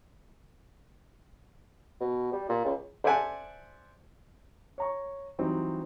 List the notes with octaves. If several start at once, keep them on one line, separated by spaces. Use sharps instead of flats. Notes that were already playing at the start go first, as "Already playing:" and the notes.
B2
G3
A#2
C#2
C5 D5 E5 F#5 G#5 A5
C#5 A#5 C#6
E3 F#3 G3 C4 D#4